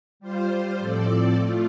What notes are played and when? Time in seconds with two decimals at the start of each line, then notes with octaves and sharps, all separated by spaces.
0.20 G3 F4 C5
0.79 A2 F3 C4 A4 D5
1.36 A3 F4